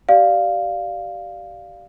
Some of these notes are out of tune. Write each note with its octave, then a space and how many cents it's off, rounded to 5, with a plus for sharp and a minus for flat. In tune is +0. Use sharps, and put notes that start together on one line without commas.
G4 -25 D5 +0 F5 +0